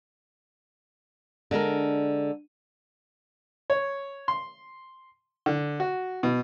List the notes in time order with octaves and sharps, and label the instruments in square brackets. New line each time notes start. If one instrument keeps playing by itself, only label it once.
[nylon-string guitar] D3 G#3 D4 A#4
[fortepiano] C#5
C6
D3
F#4
B2